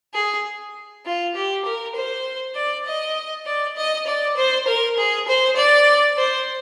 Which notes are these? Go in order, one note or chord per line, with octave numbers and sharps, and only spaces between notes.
G#4
F4
G4
A#4
C5
D5
D#5
D5
D#5
D5
C5
A#4
G#4
C5
D5
C5